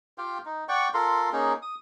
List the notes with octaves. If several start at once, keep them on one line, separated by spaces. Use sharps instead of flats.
F4 G4 F5 G5
D#4
D5 F#5 G5 C#6
F4 A4 A#4 C6
A#3 C#4 D#4 G#4
D#6